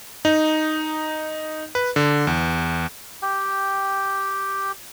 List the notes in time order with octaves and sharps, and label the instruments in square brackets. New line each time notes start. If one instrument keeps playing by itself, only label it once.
[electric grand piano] D#4
B4
D3
E2
[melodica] G4 G5